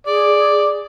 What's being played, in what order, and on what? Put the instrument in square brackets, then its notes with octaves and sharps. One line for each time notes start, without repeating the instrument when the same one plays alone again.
[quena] G#4 [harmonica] D5